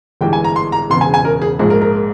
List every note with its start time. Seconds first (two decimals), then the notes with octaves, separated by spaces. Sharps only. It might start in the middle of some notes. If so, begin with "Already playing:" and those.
0.21 G1 G2 E3 G#3 G5
0.33 G#5
0.44 A#5
0.56 C6
0.72 A#5
0.90 E1 E2 C#3 C6
1.01 G#5
1.14 G#5
1.25 A#4
1.42 G#4
1.59 A#1 G#2 F3 G#3 G#4
1.70 A#4
1.81 A#4